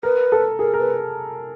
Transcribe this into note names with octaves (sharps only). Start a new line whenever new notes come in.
A#4 B4
A4
G#4 A#4
A#4
B4